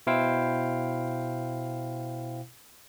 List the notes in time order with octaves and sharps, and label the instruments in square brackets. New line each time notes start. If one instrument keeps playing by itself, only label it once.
[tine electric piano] B2 E4 C5 F5 G5